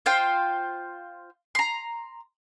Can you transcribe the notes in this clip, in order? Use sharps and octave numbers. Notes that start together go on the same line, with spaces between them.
F4 C5 F5 G5
A#5 C6